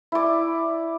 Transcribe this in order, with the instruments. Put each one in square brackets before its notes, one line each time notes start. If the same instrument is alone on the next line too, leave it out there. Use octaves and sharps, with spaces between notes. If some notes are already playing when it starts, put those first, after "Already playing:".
[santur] E4 D5